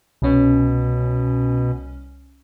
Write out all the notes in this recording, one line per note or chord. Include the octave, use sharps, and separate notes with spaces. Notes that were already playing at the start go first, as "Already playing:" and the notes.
C2 B2 C#4